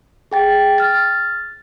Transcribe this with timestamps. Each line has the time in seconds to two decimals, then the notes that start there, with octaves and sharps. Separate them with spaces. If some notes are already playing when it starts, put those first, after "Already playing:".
0.32 G#4 G5 A6
0.78 F6 A6